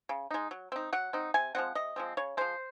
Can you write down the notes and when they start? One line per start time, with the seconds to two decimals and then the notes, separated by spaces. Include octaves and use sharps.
0.09 C#3
0.31 G#3 D#4
0.51 F#3
0.72 C4 D#4
0.93 F#3 F#5
1.13 C4 D#4
1.34 C3 G#5
1.55 F3 G#3 C4 F#5
1.75 C3 D#5
1.96 F3 G#3 C4
2.17 C#3 C#5
2.37 F3 G#3 C5